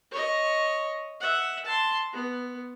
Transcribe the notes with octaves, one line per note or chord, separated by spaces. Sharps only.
C#5 D#5
E5 F#5
A5 C6
B3